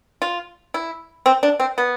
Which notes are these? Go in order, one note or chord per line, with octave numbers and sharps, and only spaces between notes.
F4
E4
C4
D4
C4
B3